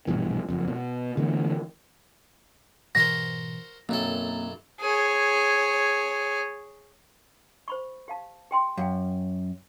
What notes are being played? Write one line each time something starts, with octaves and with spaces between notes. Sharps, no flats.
A#1 G2 B2 E3
F#1 F2
B2
D3 E3 A3 B3
G#2 B2 E3 F#4 A#4 C5 A#6
B1 F#2 A#3 C4 A4
G#4 C#5
C5 B5 C#6
G4 F5 A5
G4 G5 C6
F#2 F5 G5